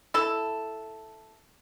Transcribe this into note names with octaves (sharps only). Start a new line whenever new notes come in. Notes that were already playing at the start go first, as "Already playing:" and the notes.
E4 A4